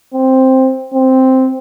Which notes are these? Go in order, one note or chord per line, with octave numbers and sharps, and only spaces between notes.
C4
C4